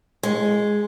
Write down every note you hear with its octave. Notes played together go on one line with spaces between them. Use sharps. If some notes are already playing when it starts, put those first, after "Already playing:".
G#3